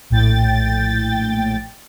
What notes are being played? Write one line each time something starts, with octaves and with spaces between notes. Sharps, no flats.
A#1 A2 G5 A6